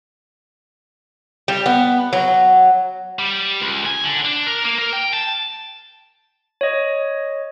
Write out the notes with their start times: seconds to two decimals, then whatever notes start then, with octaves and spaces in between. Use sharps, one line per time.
1.48 G3
1.66 B3
2.13 F#3
3.19 G3
3.60 C#2
3.86 G#5
4.04 D3
4.25 D4
4.47 A#4
4.65 A#3
4.78 A#4
4.93 G5
5.14 A5
6.61 C#5 D#5